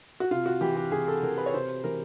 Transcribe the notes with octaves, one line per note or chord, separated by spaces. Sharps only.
F#4
C3 F4
F#4
E3 G4
G4
C3 G#4
A4
E3 A#4
B4
C#5
C3 C5
E3 A#4